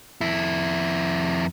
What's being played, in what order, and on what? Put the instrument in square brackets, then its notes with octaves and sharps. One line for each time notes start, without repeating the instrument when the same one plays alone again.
[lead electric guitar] F2 E4